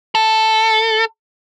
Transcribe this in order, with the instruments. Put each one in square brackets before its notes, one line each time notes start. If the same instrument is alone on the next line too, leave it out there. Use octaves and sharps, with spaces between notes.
[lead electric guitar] A4